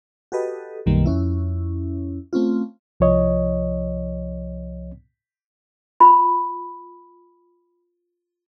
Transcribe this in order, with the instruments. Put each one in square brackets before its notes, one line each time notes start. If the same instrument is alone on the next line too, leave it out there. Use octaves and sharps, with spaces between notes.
[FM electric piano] F#4 G4 A4 B4 D#5
B1 F#2 B2 D#3 G3 A#3
F2 C#4 E4
A3 C4 C#4 F4
[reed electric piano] C2 F3 C#5 D#5
[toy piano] F4 B5